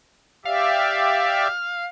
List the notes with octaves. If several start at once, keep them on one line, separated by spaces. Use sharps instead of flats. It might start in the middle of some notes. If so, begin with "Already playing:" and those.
G4 D5 E5 F5